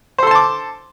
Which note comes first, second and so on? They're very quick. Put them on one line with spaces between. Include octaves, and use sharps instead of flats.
C5 A4 C6 A5 D6